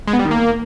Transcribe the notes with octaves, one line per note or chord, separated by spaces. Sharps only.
G#3
B3
G3
D#3
A#3